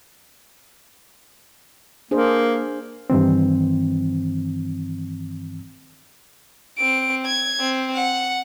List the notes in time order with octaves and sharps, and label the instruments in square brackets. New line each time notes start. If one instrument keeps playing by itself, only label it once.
[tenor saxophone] A#3 [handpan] D4 G#4 C5
[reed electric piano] G2 D#3 E3 C4
[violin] C4 D7
G#6
C4
F#5